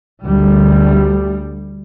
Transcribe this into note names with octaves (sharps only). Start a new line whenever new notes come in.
D2 G3